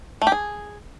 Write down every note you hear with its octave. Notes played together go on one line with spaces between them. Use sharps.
A3
G4
G#4